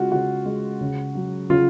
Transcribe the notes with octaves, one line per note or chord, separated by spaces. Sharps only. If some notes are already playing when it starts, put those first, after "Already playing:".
Already playing: C#3 G#3 F4 F#4
C#3 F#4
G#3
C#3
F#3
C#3 F4